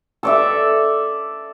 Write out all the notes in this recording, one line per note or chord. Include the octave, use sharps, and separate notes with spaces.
A4 D5 E5